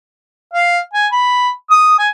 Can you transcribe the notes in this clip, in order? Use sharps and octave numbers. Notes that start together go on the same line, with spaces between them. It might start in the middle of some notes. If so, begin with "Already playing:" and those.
F5
G#5
B5
D#6
G#5